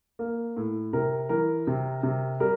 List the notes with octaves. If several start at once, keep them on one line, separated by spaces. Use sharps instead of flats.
A#3
A2
C3 A#4
E3 A#4
C3
C3
G3 A#4